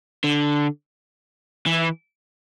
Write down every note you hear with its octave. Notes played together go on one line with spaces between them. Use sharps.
D3
E3